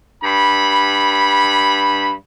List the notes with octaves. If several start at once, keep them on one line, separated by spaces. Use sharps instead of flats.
G2 B5